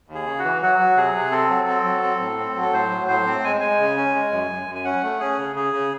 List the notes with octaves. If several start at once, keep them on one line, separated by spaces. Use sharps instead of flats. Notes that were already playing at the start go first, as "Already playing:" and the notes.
D#2
G#4
C#3
F#4
E3
F#3 F#4
F#3
C3 G#4
C3
C4 A4
F#3
C4
F#3
C4
A2
C4
F#3
A4
A2 C5
F#3
A2 C5
C4
G#3 G#5
G#3 G#5
C#3
C#4
G#3
F#2
F#2
F#2
G#5
C#4 F#5
A3
C#4 G#4
C#3
C#3 G#4
C#3